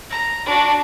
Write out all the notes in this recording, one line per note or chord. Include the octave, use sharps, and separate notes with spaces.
A#5
D4 F#4